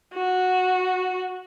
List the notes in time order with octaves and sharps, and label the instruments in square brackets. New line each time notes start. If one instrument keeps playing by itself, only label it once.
[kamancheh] F#4